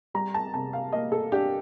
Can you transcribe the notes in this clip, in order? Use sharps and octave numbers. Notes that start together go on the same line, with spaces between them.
G3 A#5
A5
C3 A5
F5
A#3 D#5
A4
D4 G4